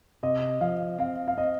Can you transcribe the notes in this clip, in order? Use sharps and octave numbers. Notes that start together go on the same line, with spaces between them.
C3 D#5
F3 F5
C4 F5
F5
C4 D#5